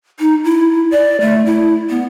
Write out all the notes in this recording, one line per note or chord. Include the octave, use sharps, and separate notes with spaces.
D#4
E4
D5
A3
E4
B3